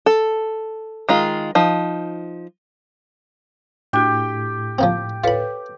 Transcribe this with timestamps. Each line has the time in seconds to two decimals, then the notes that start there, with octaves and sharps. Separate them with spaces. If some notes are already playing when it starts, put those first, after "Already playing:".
0.06 A4
1.09 D#3 G#3 F4
1.55 F3 D#4
3.93 A2 D4 F#4 G4
4.79 F3 A#3 C4
5.24 F4 A4 B4 C#5 B5